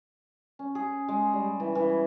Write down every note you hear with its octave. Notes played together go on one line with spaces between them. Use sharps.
C#4
G#4
G#3
G3
E3
E3
G#4